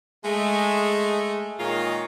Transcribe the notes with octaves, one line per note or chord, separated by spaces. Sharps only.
G#3 A3
A#2 D#3 G#3 F4 C#5 A#5